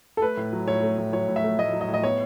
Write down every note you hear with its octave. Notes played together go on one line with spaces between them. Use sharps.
A4
A3 B4
A2
F#3
A2 C#5
A3
A2
F#3 C#5
A2
E5
A3
A2 D#5
F#3
D#5
A2
D#5
B3 C#5